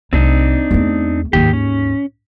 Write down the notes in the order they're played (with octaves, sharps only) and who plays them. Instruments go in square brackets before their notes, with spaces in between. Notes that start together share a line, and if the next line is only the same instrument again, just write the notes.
[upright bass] C2 A3 [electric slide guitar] C4 D4 D#4
[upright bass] E2 A3
[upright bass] D#2 G#2 [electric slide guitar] D#3 G4
[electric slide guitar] C#4